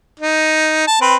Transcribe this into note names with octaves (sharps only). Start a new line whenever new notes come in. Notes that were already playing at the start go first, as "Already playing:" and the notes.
D#4
A5
C4 B4